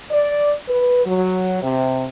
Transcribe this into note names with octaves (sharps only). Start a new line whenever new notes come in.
D5
B4
F#3
C3